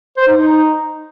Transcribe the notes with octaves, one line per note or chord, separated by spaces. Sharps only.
C5
D#4
D#4